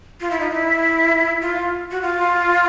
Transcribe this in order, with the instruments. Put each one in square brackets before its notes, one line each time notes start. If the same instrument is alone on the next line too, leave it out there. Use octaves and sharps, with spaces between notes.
[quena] F4
E4
D#4
E4
F4
F#4
F4